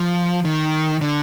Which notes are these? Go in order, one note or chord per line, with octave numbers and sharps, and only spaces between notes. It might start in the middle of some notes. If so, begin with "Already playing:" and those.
Already playing: F3
D#3
D3